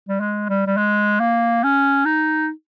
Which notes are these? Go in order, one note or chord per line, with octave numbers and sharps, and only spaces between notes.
G3
G#3
G3
G3
G#3
A#3
C#4
D#4